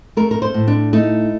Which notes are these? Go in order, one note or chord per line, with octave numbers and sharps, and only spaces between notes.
A3 A#4
A#4
C5
A2
D4
A3 D#4